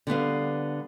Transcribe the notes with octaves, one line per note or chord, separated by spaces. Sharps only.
D3 G3 B3 F5